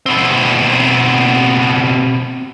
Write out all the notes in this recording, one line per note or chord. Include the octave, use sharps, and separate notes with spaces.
B2 C4